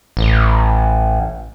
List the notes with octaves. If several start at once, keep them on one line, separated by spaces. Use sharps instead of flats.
A1